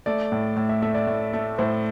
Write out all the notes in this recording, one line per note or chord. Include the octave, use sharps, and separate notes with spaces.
A3 D5
A2
A2
E5
A3 E5
D5
A2
A3
A2 C5